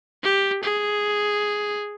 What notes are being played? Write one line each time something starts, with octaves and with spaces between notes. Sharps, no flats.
G4
G#4